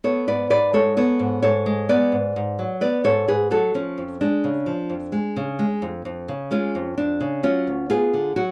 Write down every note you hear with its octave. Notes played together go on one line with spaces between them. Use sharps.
B3 A4 C#5
G#2 B4 D5
G#2 B4 D5
G#3 A4 C#5
B3 A4 C#5
G#2
G#2 A4 C#5
G#3
B3 B4 D5
G#2
G#2
F#3
B3 B4 D5
G#2 A4 C#5
G#2 G#4 B4
F#3 F#4 A4
F3 C#4
F2
G#3 D4
C#3
F3
F2
G#3
C#3
G#3
F2
F2
C#3
G#3 C#4 F4
F2
F2 D4
C#3
F#3 C#4 F4
D2
B3 F4 G#4
D3
F#3 F#4